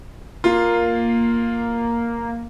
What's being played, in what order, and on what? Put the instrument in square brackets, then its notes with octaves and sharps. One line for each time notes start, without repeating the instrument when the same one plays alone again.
[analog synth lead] A#3 [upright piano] F4